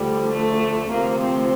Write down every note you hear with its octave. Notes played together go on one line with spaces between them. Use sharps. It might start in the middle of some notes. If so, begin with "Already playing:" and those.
Already playing: D2 D3 F3 G3
A3
D2 C3 F3 A#3
C4